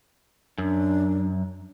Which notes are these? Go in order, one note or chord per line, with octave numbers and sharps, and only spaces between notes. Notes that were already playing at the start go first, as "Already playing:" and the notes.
F#2 D4